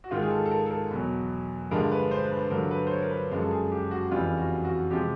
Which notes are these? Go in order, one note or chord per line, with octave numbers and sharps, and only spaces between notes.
F#4
G#2 D#3 G#3 F4
G#4
A4
A4
A#4
A4
A#4
E2 B2 F#3
G2 D3 F3 G#3 A#4
B4
C5
B4
G2 D3 F#3 A#4
B4
C5
C#5
A#4
B4
F#2 C#3 F3 G#3 A#4
A4
G#4
G4
F#4
F2 C#3 E3 G3 F4
F#4
F#4
C3 F3 G#3 G4